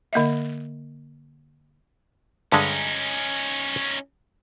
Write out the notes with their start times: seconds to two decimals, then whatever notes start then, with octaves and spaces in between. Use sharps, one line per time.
0.13 D3 A#3 D#5 E5
2.52 G2 D3 G#3 C#4 D#4